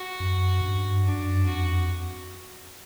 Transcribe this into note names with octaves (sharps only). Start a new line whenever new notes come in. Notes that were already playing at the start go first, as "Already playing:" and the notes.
Already playing: F#4
F#2
G2
F#2 D4
G2
F#2
F2 F#4